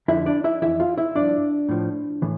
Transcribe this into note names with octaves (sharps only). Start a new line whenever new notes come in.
F2 D3 F3 E4 E5
D4 D5
E4 E5
F2 E3 E4 E5
F4 F5
E4 E5
G2 F3 D4 D5
A2 F3
A2 E3